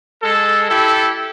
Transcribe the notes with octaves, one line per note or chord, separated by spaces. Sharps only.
G#3 A4
E4 G4 A4